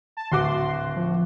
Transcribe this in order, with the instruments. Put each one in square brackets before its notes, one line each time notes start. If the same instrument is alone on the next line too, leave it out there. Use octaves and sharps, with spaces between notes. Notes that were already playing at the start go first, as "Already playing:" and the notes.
[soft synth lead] A5
[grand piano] D1 F#4 D6 [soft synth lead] C6
[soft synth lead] F3